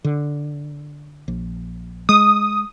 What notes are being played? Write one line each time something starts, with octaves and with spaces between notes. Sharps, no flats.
D3
A#1
G#3 D#6